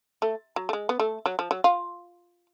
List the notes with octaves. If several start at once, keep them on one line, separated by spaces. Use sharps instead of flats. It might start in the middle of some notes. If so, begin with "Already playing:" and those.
A3
F#3
A3
G#3
B3
A3
F#3
F3
F#3
F4